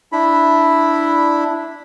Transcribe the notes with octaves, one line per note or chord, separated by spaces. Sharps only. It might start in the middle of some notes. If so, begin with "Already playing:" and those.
D4 E4 B5